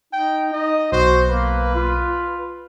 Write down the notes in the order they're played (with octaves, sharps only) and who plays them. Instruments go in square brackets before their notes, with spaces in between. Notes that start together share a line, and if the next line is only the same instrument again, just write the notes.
[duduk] D#4 [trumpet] G5
[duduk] D#4 [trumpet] D#5
[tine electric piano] B1 [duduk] F#4 [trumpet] C5
[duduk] A#3 [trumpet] B4
[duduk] F4